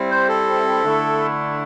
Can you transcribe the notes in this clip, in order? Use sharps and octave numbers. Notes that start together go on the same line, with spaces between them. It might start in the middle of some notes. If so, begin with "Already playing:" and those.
Already playing: G3 C4 E4
C5
A4
D3 A3 E4